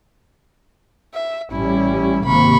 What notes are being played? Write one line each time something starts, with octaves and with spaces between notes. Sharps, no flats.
E5
A1 G3 C#4 E4
G#1 C3 A#3 B5 C#6